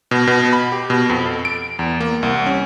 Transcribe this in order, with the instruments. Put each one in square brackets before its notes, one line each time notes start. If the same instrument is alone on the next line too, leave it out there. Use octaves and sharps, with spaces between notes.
[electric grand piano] B2
B2
B5
G4
B2
F2
A4
D7
E2
A#3
C2
C#4